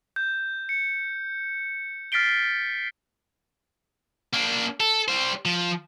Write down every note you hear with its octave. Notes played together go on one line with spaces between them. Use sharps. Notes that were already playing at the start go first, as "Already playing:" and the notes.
G6
C#7
F6 A6 B6 C7 D7 G7
A#3 D4
A4
G3 C5
F3